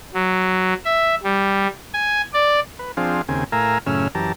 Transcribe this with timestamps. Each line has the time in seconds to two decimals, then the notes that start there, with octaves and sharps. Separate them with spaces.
0.14 F#3
0.85 E5
1.23 G3
1.94 G#5
2.33 D5
2.79 B4
2.97 F3 C4 D4 G#4 F5
3.29 D#2 C#3 C4 G#5
3.52 A2 A#4 F5 G#5 A#5 E6
3.86 F#2 A2 C#3 C#4 E6 F6
4.15 F#2 E3 G4 A5 A#5